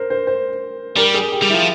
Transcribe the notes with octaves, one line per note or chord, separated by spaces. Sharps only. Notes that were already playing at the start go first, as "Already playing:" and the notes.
Already playing: A#4 C5
C5
C5
G3 A#4
G#4
G4
G3
E4
F3